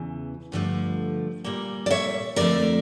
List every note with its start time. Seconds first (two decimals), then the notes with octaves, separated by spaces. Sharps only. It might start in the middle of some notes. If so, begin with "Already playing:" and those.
Already playing: E2 C#3 E3
0.52 G2 D3 F3 A3
1.44 A#2 G3 A#3
1.86 D5
1.90 C#5 E5
2.36 F2 D3 F3 A3 A#4 D5